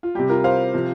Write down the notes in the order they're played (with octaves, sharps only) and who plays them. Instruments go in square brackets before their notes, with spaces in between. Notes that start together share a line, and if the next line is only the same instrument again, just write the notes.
[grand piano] F4
C3 G3 G4
F4 A#4
C5 F5
C3 F3